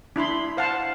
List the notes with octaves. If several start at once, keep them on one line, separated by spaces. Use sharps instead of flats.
D4 E4 B5 C6
C5 F5 F#5 A5